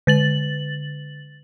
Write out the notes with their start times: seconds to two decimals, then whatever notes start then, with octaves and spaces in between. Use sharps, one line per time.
0.07 D3 A6 F#7